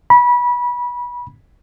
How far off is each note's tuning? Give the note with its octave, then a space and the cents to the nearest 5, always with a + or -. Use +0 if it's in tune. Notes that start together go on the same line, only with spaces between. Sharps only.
B5 -25